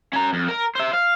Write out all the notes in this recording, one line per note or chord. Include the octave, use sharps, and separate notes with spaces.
C#4 A#5
F2
A#4
C5 E5
F5